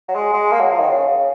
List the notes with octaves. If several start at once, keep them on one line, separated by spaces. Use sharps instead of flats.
F#3
G#3
G#3
A#3
F#3
F3
D#3
C#3
C#3